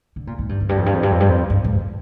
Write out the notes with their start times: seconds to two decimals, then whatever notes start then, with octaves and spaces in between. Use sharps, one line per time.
0.16 D3
0.27 A#2
0.39 G#2
0.49 G2
0.61 F2
0.69 G2
0.77 F2
0.86 G2
0.94 F2
1.03 G2
1.11 F2
1.20 G2
1.29 F2
1.50 G2
1.64 G#2